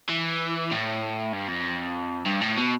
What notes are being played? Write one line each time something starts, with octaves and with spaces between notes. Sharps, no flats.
E3
A2
G2
F2
G2
A2
B2